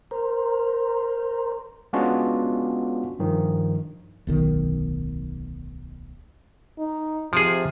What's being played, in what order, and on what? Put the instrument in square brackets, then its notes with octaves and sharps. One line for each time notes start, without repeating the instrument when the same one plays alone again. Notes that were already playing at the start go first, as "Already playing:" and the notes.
[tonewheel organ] A#4 C5
[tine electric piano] G#3 B3 C#4 D4 F4 F#4
G2 D#3 F3
[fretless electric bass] D1 B1 D#3
[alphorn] D#4
[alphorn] C3 [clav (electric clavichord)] F3 G#4